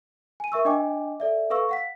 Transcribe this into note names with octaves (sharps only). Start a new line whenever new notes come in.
G#5 D#7
A#4 E5 C#6 E6
D4 D#5 G5 G#5 D6
A4 D5 E5
A4 B4 F5 C#6 E6
F5 F#5 B6